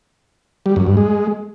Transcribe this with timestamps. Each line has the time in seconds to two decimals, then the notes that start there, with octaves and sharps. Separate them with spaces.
0.66 G3
0.76 F#2
0.87 G2
0.97 G#3